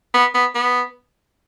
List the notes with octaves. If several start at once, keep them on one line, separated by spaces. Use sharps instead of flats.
B3
B3
B3